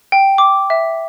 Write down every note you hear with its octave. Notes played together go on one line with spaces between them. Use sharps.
G5
D6
E5